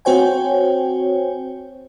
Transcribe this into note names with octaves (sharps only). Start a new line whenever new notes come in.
C4 F#4 C5 C#5 G5 G#5